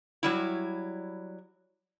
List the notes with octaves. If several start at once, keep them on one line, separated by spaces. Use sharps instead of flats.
F#3 G3 E4